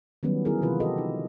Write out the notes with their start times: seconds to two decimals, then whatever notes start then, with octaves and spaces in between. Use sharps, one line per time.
0.23 D#3 F#3 G3 B3 C#4
0.45 D3 B3 E4 G#4 A#4
0.62 C3 E3 F4 B4
0.80 F#4 G4 A4 A#4 D#5
0.98 D#4